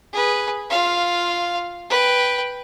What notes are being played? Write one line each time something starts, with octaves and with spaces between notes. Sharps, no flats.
G#4 B4
F4 F5
B4 G5